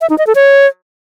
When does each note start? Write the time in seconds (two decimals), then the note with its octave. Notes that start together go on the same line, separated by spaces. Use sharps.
0.01 E5
0.10 D#4
0.18 D#5
0.27 A4
0.35 C#5